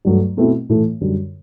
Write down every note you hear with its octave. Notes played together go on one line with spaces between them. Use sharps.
G2 F#3 A3
B2 A3 C4 E4
A2 E3 A3
F#2 D3 G3